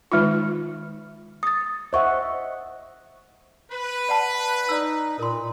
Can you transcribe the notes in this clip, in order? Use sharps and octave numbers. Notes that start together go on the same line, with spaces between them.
D#3 G#3 D#4 F4
D#6 A6
C5 D#5 E5 F#5 C#6
B4
D5 F#5 A5
D#4 D5 E6
A#2 A#4 C6